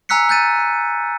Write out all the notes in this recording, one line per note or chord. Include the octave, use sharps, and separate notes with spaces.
G#5 A#5 E6 F#6 B6 C#7
F#6 G6 A6 D#7